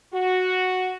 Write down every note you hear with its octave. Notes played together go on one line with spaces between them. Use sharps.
F#4